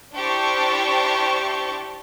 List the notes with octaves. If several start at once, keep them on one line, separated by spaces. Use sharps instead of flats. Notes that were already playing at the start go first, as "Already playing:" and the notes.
D4 E4 G4 C5 A5 C#6